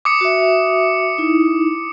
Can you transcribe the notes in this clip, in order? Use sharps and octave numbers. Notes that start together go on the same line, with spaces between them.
D6 D#6 C#7
F#4 E5
D#4 E4